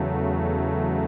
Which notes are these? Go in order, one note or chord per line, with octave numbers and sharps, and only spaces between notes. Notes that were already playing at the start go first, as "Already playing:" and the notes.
Already playing: E2 C#3 F#3 A3
E4